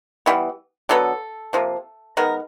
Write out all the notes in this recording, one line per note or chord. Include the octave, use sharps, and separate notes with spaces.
E3 G3 B3
D3 F#3 B3 A4
C3 F3 A#3
D#3 G#3 B3 A#4